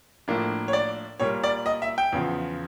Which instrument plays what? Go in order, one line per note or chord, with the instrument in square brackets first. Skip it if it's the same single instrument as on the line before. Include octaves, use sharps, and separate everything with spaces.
[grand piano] A2 F3 A#3 D4
C#5
D5
A#2 G3 A#3 C#5
D5
D#5
E5
G5
E2 C#3 F3